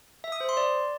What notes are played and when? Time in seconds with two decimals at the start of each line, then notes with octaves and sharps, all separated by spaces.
0.24 E5
0.32 D#6
0.40 C5
0.49 C6
0.57 D5